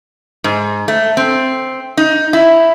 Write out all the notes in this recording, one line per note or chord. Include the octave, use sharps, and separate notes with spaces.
G#2
A3
C4
D#4
E4